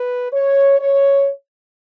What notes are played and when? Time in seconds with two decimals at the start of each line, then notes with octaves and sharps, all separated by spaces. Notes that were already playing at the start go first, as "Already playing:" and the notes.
Already playing: B4
0.33 C#5
0.80 C#5